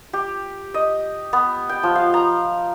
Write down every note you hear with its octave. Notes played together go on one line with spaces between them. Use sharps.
G4
D#5
B3
G5
F3
F5
A#5